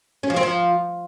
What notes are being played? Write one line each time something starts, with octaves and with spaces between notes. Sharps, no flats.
C#4
F3
C4
F3